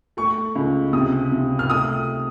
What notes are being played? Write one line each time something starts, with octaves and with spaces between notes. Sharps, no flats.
A3 C#6
C#2
C3 D#6
C3
F6
A3 D#6